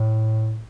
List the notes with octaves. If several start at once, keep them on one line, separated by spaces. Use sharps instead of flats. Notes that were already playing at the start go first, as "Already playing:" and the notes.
Already playing: A2